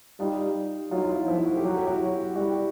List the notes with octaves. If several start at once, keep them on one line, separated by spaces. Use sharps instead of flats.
G3 D#4 F4
F#3 D#4 F4
F4
E4
F3 E4
F#4
G4
F#3 F#4
G4
E4 F#4
G3 E4 F#4